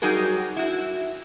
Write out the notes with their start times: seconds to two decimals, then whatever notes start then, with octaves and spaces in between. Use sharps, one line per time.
0.02 F#3 G3 D#4 F#4 G#4 A#4
0.56 E4 F#4